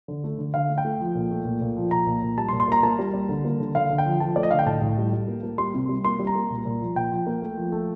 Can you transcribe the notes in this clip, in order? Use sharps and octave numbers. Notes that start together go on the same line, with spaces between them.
D3
A3
D3
D3 F5
A3
G5
A3
F3
A#2
A3
A#2
A#2
F3
A#2 A#5
A#2
A#2
G3 A5
C6
A#2
C6
A#3 A#5
A#3 A5
G3
G3
D3
A#3
D3
D3 F5
D3
G5
F3
F3 A5
A3 D5
D#5
D3 F5
G5
A2 A5
A2
G3
G3
A#3
A#3
G3 C6
C3
G3
A#3 C6
G3
A#5
A#3
A#2
A#2
F3
A#2 G5
F3
A#3
A3
F3
A3